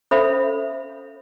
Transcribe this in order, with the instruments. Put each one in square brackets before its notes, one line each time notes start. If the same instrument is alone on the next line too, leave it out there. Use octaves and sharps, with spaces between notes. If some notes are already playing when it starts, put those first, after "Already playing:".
[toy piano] C#4 A4 C5 E5 F5 B5